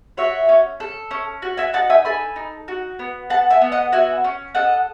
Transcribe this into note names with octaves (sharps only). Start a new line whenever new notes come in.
F#4 C#5 E5
C#4
A4
C#4
F#4
E5 G#5
D#4 F#5 A5
E5 G#5
A4 G#5 B5
D#4
F#4
B3
A4 F#5 A5
E5 G#5
B3
D#5 F#5
F#4 E5 G#5
C#4
A4 D#5 F#5